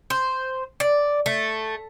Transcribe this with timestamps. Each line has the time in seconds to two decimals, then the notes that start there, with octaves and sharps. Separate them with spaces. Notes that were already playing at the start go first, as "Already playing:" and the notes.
0.10 C5
0.80 D5
1.26 A3